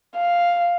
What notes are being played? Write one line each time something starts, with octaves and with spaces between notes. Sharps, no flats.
F5